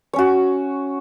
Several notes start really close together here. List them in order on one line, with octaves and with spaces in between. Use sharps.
C#5 C#4 F#4